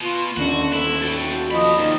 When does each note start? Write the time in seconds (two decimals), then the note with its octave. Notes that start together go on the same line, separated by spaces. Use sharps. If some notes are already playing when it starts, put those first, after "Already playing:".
0.01 B2 F4
0.37 D#2 D3 C#4 F#4
0.73 E4 A4
1.02 F#4 A4 G5
1.51 C3 F3 D#5 B5
1.77 A#2 D#3